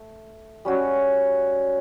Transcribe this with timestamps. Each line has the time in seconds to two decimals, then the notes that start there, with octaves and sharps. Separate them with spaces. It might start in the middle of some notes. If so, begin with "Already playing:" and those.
Already playing: A3
0.65 G3 C#4 F#4 C#5